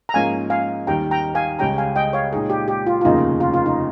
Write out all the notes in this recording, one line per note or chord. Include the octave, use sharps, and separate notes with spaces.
A#5
G#2 F3 A#3 C#4 F5 G#5
F5 G#5
D#2 D#3 G3 G5 A#5
G5 A#5
F5 G#5
C#2 C#3 G3 C#4 G5 A#5
F5 G#5
D#5 G5
C#5 F5
A#2 G#3 D#4 G#4
G4
G4
F4
F4
F1 D#2 C#3 F3 A#3 D#4
F4
F4
D#4